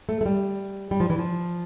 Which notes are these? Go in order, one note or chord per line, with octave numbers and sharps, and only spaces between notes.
A3
A3
G3
G3
F3
E3
F3